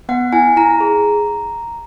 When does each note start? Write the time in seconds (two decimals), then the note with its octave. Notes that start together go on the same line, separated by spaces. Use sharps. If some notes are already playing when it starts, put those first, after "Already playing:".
0.09 B3 F#5
0.33 E4 G#5
0.56 E4 A#5
0.80 G#4